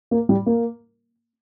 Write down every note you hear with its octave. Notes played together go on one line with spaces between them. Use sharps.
A#3
G3
A#3